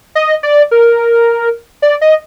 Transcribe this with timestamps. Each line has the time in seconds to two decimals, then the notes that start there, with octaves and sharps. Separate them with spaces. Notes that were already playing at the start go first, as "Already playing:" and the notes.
0.15 D#5
0.43 D5
0.71 A#4
1.82 D5
2.01 D#5